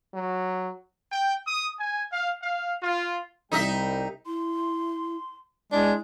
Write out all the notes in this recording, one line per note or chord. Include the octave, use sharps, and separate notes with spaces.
F#3
G5
D#6
G#5
F5
F5
F4
C2 G3 D#4 D#5 E5 G5
E4 C6
G#3 D4 E4